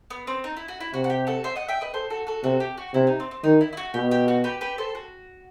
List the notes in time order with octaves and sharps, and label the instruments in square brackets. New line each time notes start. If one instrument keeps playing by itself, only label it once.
[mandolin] B3
C4
D#4
E4
F#4
E4
[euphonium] C3 [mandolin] F#4
[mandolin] F#4
G4
F#4 A4
C5 E5
D#5 F#5
E5 G5
B4 D#5
A4 C5
F#4 A4
F#4 A4
[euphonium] C3 [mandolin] F#4 A4
[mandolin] G4
F#4
[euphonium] C3 [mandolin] E4
[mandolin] D#4
C4
C4
[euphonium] D#3 [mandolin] D#4
[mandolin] E4
E4
F#4
[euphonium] B2 [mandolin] G4
[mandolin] G4
F#4
G4 B4
G4 B4
A4 C5
F#4